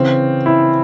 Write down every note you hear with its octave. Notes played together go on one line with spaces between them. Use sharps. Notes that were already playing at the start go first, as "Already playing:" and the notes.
Already playing: C#3 E3 C4
E4